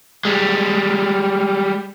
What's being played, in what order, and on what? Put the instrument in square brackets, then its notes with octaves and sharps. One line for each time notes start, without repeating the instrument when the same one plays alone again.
[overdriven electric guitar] G3 G#3